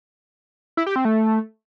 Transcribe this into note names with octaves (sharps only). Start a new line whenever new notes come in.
E4
G4
C4
A3